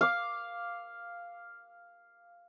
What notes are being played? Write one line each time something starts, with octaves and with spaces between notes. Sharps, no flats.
F5 D6